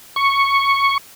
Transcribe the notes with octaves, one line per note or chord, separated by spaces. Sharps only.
C#6